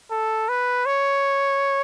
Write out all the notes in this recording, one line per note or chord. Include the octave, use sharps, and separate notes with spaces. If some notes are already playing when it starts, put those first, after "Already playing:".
A4
B4
C#5